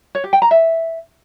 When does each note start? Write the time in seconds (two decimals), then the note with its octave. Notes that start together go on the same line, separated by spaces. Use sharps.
0.15 C#5
0.24 G4
0.33 G5
0.42 A#5
0.51 E5